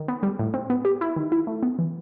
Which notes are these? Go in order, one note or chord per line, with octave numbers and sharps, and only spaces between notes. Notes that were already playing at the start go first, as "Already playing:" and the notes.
Already playing: D#3
B3
G3
A2
C4
B3
G4
E4
D#3
E4
A3
B3
E3